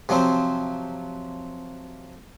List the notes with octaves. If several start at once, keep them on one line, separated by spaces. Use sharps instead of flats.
C3 F3 F#3 C4